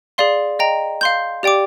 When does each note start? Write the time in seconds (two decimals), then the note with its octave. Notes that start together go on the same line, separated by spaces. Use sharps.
0.18 G#4 D5 F5 C6
0.59 D#5 G5 A#5
1.01 F5 C6 G6
1.43 G4 D5 G5 D6